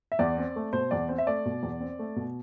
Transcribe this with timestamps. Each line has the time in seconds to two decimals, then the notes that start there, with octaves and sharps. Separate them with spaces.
0.12 E5
0.19 E2 D5
0.38 C4
0.56 A3
0.73 B2 C5
0.91 E2 D5
1.09 C4 C5
1.18 E5
1.27 A3 D5
1.45 B2
1.63 E2
1.80 C4
1.99 A3
2.16 B2